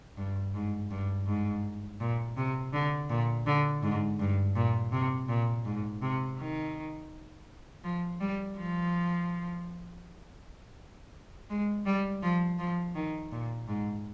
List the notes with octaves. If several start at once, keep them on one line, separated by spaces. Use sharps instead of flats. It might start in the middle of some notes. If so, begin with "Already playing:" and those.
G2
G#2
G2
G#2
A#2
C3
D3
A#2
D3
G#2
G2
A#2
C3
A#2
G#2
C3
D#3
F3
G3
F3
G#3
G3
F3
F3
D#3
A#2
G#2